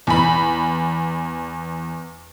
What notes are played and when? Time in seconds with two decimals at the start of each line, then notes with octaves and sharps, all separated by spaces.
0.07 E2 B5